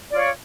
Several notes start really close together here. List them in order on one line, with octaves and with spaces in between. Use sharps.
D5 F4 C#5